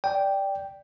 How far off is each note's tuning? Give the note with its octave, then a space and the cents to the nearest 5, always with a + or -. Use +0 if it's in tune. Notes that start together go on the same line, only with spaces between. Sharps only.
D5 -5 G5 +0